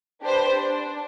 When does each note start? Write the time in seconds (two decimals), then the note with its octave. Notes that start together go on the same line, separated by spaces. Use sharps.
0.23 D4 G4 B4 C5
0.55 D4